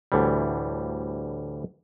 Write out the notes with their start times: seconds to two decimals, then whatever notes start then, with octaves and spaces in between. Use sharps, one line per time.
0.12 D2 A2 E3 G3